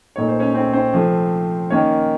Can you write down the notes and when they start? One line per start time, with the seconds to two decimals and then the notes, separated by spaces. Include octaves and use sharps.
0.16 A#2 A3 D#4 C#5
0.28 C5
0.39 C#4 C#5
0.55 C4 C5
0.73 C4 C5
0.93 C3 F3 A3
1.70 D#3 A#3 C#4 C#5